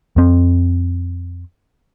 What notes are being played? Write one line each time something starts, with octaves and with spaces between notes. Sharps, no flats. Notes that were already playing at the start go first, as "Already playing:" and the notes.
F2 C4